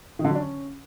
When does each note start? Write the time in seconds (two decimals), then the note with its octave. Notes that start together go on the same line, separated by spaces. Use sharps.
0.19 D#3
0.24 D3
0.30 F#3
0.35 D4
0.40 C#4